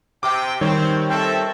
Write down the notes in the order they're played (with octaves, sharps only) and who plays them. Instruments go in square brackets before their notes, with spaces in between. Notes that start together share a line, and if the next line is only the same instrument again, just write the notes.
[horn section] C3 G5 [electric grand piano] D6
[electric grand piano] D#3 G3 C#5 [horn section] C4
[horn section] C4 A4 E5